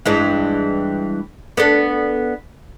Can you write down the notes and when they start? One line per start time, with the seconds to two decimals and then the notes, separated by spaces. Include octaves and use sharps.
0.06 G2 E3 G#3
1.57 B3 D4 A4